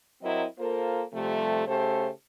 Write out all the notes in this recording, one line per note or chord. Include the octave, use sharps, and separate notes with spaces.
F#3 C4 E4 A#4 D#5
A#3 F4 A4 A#4 C5
C3 F3 G3 A3
C#3 A3 G4 A4 C5